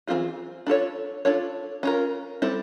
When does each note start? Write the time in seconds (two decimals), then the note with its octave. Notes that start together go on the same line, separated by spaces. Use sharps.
0.07 E3 A3 C4 F4 G#4
0.67 D4 F4 A4 C#5
1.25 D4 F4 A4 C#5
1.83 C#4 F4 A#4
2.42 G3 C4 E4 A4